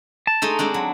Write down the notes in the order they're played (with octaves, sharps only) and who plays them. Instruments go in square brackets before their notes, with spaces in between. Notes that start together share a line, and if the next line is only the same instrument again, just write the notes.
[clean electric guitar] A5
[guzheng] G#3 A3 D#4
G#3 C4 D4
F#3